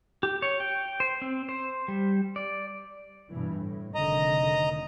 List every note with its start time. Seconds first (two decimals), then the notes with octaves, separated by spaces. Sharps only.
0.23 G4
0.42 C#5
0.60 G5
1.00 C5
1.22 C4
1.49 C5
1.88 G3
2.36 D5
3.31 G2 B2 E3
3.60 A2
3.95 F1 D3 D#3 D#5 A#5